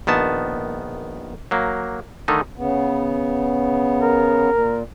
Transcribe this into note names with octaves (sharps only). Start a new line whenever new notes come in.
A#1 D#3 B3 A5
F#3 A#3
D3 D#3 A3 D#4
C#3 B3
A#4
A#2